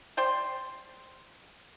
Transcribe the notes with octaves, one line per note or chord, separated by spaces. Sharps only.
C5 D5 G5 C6